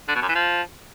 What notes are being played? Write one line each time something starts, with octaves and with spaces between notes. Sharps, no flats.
D3
B2
F#2
E3
F3